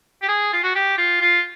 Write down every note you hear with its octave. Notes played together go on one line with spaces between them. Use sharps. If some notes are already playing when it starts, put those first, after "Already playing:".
G4
G#4
F4
F#4
G4
F4
F4